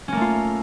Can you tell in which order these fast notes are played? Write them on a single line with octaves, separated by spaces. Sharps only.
C#4 A#3 A3 F4